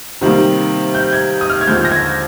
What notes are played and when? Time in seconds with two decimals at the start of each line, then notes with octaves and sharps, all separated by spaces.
0.21 C3 D#3 G3 A#3
0.95 G6
1.13 G#6
1.41 D#6
1.50 F6
1.61 G#6
1.67 D#2 D3 F3 G#3 G6
1.85 A#6
1.92 G#6